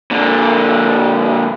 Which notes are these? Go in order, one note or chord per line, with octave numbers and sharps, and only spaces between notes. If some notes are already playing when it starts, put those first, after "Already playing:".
A#2 D3